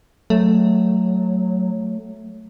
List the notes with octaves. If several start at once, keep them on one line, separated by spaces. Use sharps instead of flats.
F#3 A3